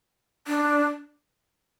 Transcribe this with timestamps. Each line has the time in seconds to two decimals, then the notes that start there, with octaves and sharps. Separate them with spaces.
0.48 D4